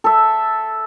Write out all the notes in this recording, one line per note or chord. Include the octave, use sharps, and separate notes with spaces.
A4 E5